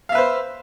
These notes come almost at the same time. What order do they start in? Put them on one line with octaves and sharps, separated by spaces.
F5 E5 B4 C5